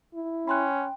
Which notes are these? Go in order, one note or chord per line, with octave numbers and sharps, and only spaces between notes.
E4
C#4 G5 B5 C6 F#6